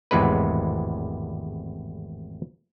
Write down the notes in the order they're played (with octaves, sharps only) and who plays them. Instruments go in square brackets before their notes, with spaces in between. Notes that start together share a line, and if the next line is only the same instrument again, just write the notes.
[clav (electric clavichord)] G#1 E2 A2 C3 G#3 B4